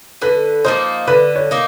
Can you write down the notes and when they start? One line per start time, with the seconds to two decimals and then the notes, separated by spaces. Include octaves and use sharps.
0.22 D3 B4
0.65 F3 A#3 D#4 C5
1.07 D3 B4
1.36 C#5
1.51 A#3 D#4